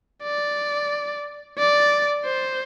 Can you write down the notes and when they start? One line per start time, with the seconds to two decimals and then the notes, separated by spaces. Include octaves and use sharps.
0.23 D5
1.58 D5
2.25 C5